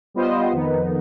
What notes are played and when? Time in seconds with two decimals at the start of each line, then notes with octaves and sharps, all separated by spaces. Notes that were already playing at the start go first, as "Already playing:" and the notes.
0.14 G3 B3 F4 C5 D#5
0.52 F2 D#3 B3 D#4